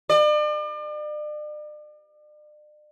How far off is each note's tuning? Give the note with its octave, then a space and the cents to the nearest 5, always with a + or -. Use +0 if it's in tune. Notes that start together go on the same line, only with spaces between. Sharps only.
D5 +40